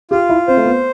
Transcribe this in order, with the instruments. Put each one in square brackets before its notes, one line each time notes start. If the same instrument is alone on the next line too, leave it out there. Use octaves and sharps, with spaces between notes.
[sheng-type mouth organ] F4 [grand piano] G4
[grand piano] E4
[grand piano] C4 [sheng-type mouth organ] C5
[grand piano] A3
B3